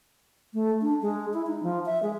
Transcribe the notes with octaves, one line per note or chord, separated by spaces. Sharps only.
A3
D4
G#3
E4
D#4
F3
E5
G#3